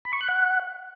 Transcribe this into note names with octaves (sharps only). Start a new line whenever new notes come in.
B5
C#6
F#6
F#5